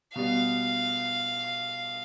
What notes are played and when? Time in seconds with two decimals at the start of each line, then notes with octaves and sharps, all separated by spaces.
0.16 B2 G3 B3 F5